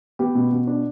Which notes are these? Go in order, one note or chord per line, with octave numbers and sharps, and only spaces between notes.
B3 G4
B2
B2
D4